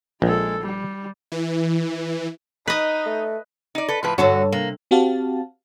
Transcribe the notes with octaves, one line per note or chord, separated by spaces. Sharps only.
A#1 G#3 A4
G3
E3
D#4 B4 D#5
A3
D#4 D5
A4 B4
A2 F3 B4
G2 D3 F#4 A4 C#5
C3 A#3
C4 F#4 G4 F5 A5